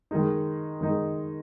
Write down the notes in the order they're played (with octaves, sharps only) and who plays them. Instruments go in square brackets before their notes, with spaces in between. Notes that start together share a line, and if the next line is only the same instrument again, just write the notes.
[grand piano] D#3 G#3 D#4
D#3 G#3 D#4